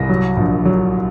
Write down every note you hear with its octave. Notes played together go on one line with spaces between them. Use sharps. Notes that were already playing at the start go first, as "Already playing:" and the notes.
Already playing: C2 A#6
F#3
A#1
F#3